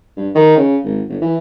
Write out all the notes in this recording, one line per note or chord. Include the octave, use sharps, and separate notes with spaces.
G2
D#3
C#3
G#1
G1
E3